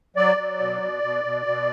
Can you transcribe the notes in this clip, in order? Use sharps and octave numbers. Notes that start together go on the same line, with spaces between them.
F#3 D5
F#3
B2
B2
B2
B2
B2